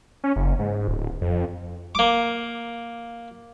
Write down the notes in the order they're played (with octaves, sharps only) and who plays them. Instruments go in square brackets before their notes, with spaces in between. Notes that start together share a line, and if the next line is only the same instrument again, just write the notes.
[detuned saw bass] C#4
F#1
G#2
D1
F2
[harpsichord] A#3 D6